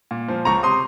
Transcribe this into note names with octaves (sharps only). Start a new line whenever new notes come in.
A#2
F3
C#2 A#5 C#6
C3 C6 D#6